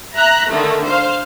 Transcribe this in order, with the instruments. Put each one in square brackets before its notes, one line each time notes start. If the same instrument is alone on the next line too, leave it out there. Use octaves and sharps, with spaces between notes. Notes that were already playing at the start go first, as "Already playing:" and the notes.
[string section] E5 A#5 F#6
D3 D#3 A3
C5 F5